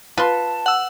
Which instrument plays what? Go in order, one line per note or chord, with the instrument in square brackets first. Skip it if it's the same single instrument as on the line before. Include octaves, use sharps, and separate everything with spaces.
[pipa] F4 C6 [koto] B4 [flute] A5
[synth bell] F#5 E6